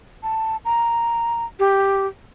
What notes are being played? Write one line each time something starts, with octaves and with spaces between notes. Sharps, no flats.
A5
A#5
G4